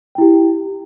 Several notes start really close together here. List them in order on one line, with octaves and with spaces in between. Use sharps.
G5 E4 G4